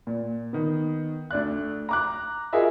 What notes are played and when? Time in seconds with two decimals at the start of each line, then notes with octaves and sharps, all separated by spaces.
0.07 A#2
0.53 D#3 B3
1.31 D2 D5 F#6
1.89 A#5 D6 F#6
2.53 F4 F#4 G#4 A#4 D#5 E5